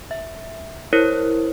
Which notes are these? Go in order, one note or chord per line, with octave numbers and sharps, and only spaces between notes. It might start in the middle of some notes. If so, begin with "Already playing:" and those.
E5
E4 A#4 C5 C#5